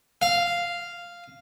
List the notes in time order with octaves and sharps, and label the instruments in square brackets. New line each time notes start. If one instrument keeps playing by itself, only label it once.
[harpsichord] F5